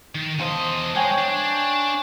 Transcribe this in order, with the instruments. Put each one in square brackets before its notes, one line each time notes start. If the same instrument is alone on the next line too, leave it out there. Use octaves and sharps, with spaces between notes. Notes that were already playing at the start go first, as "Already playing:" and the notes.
[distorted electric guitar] D#3
[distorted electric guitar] E2 D#5 [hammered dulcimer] C5 F5 A5
[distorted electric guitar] G#3 [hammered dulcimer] C#5 G5 G#5
[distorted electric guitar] D4